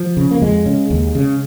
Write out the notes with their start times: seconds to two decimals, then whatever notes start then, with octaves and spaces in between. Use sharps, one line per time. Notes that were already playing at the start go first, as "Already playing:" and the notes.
Already playing: F3
0.17 C#3
0.31 A#3
0.42 F2 G#3
0.66 C#3
0.90 D#2
1.15 C#3